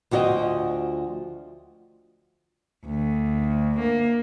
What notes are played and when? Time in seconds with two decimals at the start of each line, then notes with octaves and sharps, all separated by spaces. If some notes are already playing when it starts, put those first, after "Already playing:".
0.11 D2 F3 F#4 G#4 D#5 G5
2.86 D2
3.80 A#3